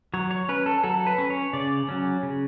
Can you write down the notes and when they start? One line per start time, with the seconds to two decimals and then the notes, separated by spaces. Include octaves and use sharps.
0.14 F#3 C#5
0.31 C#5
0.49 C#4 B4
0.66 A4
0.83 F#3 A4
1.07 B4
1.18 C#4
1.30 C#5
1.53 C#3 D5
1.89 F#3 C#4
2.23 C#3